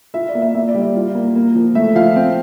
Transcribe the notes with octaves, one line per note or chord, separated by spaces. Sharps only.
F4 E5
D5
A#3
E5
A#3 E5
D5
G3
D5
F4
A#3
A#3
F3
A3 E5
F3 F5
C4